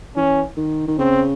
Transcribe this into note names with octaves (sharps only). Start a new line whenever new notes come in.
E3 C#4
D#3
D#3
C#3 C4